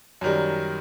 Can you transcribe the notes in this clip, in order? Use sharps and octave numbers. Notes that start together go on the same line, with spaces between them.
F#2 D#3 G3